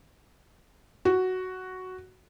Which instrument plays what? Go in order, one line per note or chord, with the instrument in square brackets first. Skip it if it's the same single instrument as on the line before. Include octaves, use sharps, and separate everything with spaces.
[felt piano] F#4